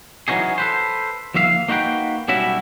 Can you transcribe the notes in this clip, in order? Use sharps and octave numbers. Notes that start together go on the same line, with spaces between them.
E3 F#3 C#4 D#4 G#4
A4 B4 C5
D#2 F3 A#3 E5 F5
A#3 D#4 F#4 B4 G5
B1 G3 C#4 E4 F#4 E5